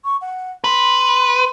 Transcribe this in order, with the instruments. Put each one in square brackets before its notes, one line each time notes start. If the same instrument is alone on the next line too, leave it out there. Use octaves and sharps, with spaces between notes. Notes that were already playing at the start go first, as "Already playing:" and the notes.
[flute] C#6
F#5
[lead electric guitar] B4 [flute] C6